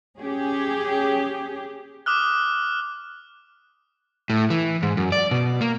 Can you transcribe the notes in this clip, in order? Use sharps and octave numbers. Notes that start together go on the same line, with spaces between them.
C#4 G4 G#4
D6 D#6 F6 F#6
A2
E3
G#2
F#2
D5
B2
A#3